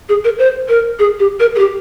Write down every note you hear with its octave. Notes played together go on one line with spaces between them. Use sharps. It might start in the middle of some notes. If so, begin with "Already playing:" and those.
G#4
A#4
C5
A#4
G#4
G4
A#4
G#4
G4